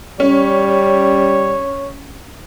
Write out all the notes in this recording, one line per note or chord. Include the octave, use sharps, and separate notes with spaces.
G3 C#4 C#5